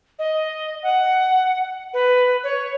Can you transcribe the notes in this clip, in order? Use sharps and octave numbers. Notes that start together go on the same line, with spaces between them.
D#5
F#5
B4
C#5